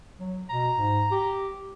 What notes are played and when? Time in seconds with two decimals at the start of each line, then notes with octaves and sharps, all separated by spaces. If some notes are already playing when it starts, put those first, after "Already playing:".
0.18 F#3
0.49 B2 A#5
0.76 G#2
1.11 G4